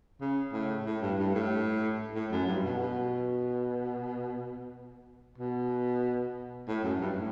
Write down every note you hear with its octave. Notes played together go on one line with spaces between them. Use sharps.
C#3
A2
A2
G2
G2
A2
A2
F#2
G2
B2
B2
B2
A2
F#2
G2
A2